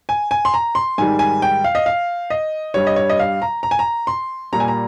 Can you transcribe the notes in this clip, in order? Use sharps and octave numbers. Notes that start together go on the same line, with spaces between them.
G#5
G#5
C6
A#5
C6
G#2 D#3 G3 G#5
G#5
G5
F5
D#5
F5
D#5
G2 G3 C#5
D#5
C#5
D#5
F5
A#5
A#5
G#5
A#5
C6
A#2 G3 A#5
G#5
A#5